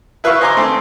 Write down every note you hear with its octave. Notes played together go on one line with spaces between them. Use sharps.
E4 B4 E5 F5 C#6
C5 D#5 G#5 A#5 C6 D6
A3 C4